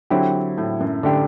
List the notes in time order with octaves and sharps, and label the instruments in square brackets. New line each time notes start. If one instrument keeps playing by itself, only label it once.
[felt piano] D3 [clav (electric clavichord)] F#3 C4 E4 G4
[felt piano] A2
F#2
[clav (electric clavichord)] D3 A3 D4 G4